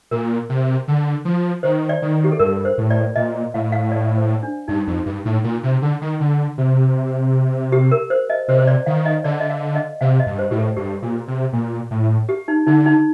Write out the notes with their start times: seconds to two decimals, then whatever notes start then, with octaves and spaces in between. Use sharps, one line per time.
0.11 A#2 A#4
0.49 C3
0.88 D3
1.25 F3
1.63 D#3 C5
1.89 D5
2.02 D#3
2.24 G4
2.32 A4
2.39 G2 A#4
2.65 C5
2.78 A2
2.90 D5
3.16 A#2 D#5
3.54 A2 F5
3.72 F5
3.92 D5
4.17 C5
4.43 D4
4.68 G2 D#4
4.87 F2
5.06 G2
5.25 A2
5.44 A#2
5.63 C3
5.82 D3
6.01 D#3
6.20 D3
6.58 C3
7.72 G4
7.91 A#4
8.10 C5
8.30 D#5
8.48 C3 C5
8.59 C5
8.67 D5
8.86 D#3 F5
9.06 D#5
9.24 D3 D5
9.40 D#5
9.50 F5
9.75 D#5
10.01 C3 F5
10.20 D#5
10.26 G2
10.39 C5
10.51 A2 G4
10.58 A4
10.76 G2 G4
11.02 A#2
11.28 C3
11.53 A#2
11.91 A2
12.29 G4
12.48 D#4
12.67 D3 D#4
12.86 D#4